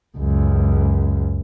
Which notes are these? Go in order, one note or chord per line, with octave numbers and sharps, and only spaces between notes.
C#2 F#2